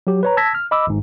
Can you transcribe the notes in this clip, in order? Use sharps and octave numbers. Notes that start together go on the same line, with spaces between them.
F#3 G4
B4 C#5 A#5
A5 E6 G#6 A#6 B6
F6
D#5 B5 D6 E6
G#1 G#2